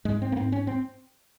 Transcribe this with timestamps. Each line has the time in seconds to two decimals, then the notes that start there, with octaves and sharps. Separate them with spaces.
0.05 G#2 G#3
0.22 C4
0.32 A#3
0.36 G#2 C4
0.52 C#4
0.67 C4